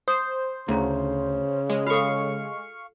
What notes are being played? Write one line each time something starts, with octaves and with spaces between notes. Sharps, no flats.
C5 D#6
D2 C#3 E4 A#5
G#3 D6
F4 A4 F5 C#6